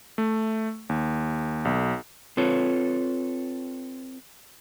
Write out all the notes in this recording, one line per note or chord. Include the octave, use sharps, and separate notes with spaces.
A3
D#2
B1
C4 F4 A4 B4 C#5